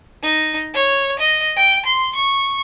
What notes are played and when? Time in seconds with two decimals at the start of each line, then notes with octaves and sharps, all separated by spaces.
0.23 D#4
0.74 C#5
1.19 D#5
1.56 G5
1.85 C6
2.15 C#6